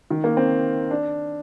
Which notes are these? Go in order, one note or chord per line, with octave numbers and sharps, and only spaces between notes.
D#3
A#3
C4
D4